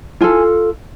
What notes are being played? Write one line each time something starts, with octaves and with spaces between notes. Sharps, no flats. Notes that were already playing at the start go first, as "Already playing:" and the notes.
F4 A4 G#5